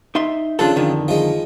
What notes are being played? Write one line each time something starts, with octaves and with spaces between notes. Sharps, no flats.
D#4 E5 C6
C#3 F3 D4 F4 A4
F2 D3 D#3
F3 G#3